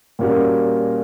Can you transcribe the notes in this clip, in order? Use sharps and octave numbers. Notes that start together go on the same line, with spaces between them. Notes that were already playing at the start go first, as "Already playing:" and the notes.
A#2 G3 A#3 C#4 F#4